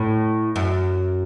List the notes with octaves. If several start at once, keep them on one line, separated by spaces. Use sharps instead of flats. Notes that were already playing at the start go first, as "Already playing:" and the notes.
Already playing: A2
F#2